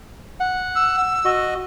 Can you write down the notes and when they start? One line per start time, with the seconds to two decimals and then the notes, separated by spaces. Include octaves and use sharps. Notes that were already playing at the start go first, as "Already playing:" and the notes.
0.40 F#5
0.75 E6
1.25 F#4 D#5